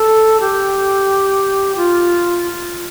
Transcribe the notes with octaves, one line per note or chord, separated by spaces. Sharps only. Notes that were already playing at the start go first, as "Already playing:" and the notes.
Already playing: A4
G4
F4